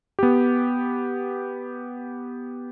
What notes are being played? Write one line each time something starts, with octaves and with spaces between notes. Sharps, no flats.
B3 G4